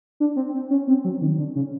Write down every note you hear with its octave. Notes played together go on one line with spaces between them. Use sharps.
D4
C4
C4
C#4
C4
F#3
D#3
D3
C#3